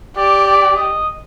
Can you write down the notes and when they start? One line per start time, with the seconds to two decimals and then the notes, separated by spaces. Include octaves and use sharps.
0.16 G4 D5
0.47 D5
0.76 D#5